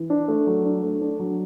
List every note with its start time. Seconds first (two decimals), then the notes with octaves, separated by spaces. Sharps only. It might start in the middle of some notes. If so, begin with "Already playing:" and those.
Already playing: E3
0.10 D4
0.28 A3
0.47 F#3
0.65 D4
0.83 A3
1.01 D4
1.19 F#3